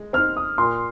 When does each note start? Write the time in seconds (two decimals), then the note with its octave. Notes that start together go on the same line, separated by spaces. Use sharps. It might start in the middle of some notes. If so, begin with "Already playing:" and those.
Already playing: G#3
0.13 C4 F6
0.18 D#4
0.37 D#6
0.58 A#2 C6